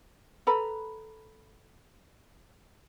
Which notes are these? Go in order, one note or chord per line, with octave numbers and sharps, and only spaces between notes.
A4 B4 A#5 B5